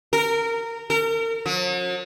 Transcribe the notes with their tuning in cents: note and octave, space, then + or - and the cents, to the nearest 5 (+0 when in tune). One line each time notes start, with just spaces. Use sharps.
A#4 -20
A#4 -35
F#3 -45